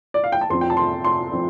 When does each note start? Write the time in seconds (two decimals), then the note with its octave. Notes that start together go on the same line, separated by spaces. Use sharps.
0.14 D5
0.24 F5
0.32 G5
0.41 A5
0.50 F2 F3 C4 C6
0.61 G5
0.70 A5
0.77 C6
1.04 C6
1.33 F3 C4